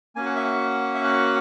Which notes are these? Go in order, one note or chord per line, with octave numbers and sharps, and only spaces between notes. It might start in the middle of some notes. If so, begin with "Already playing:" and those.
A#3 C#4 F#4 G#5
F#5
E5
F#5
E5
F#5